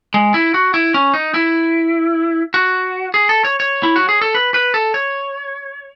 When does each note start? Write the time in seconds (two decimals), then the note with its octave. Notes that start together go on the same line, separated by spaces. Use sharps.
0.14 G#3
0.34 E4
0.54 F#4
0.74 E4
0.94 C#4
1.14 D#4
1.34 E4
2.54 F#4
3.14 G#4
3.29 A4
3.45 C#5
3.60 C#5
3.83 E4
3.96 F#4
4.09 G#4
4.22 A4
4.35 B4
4.54 B4
4.74 A4
4.94 C#5